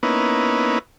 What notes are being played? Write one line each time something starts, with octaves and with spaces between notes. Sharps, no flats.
A#3 B3 C#4 D#4 E4 B4